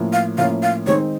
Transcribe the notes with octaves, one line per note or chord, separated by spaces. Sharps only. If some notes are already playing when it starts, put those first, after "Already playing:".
Already playing: A2 F3 A#3 C#4
F5
A2 F3 A#3 C#4 F5
F5
D#3 G#3 C4 D#4 C#5